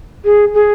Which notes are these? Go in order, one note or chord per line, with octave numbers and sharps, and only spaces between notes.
G#4
G#4